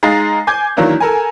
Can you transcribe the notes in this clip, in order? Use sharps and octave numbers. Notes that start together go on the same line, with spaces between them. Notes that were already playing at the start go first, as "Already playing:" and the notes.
G#3 D#4 F5 A#5 A6 C7
G#5 D6 G6 G#6
D#3 E3 F#3 A#3 D4 E4
A4 A#4 G#5